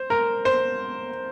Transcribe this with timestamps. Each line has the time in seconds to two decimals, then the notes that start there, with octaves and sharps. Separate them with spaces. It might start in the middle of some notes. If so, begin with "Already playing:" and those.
Already playing: C5
0.10 A#4
0.45 C5